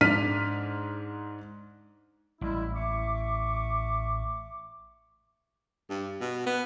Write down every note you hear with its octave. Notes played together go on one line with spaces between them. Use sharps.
G#2 D4 F6 B6 D#7
A1 G3 G#3 E4
E5 C#6 D6
G2
B2
B3